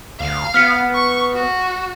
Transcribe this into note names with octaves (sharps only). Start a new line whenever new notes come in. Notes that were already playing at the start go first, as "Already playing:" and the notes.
D2 F5
B3 F6 B6 C#7
C#6
F#4